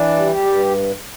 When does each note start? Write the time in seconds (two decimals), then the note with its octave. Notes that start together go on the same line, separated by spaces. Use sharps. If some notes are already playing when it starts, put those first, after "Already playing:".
Already playing: E3 D4
0.16 G3
0.32 G4
0.46 G2